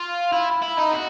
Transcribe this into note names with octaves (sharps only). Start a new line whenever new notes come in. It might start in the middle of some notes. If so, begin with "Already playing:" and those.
Already playing: F4
E4
E4
D#4
F#4